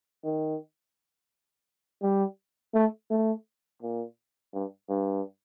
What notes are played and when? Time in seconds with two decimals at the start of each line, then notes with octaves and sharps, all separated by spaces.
0.24 D#3
2.02 G3
2.74 A3
3.10 A3
3.82 A#2
4.54 G2
4.89 G2